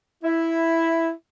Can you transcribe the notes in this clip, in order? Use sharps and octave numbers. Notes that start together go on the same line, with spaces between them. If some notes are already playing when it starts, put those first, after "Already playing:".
E4